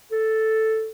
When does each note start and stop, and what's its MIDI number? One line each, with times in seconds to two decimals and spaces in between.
0.12 0.90 69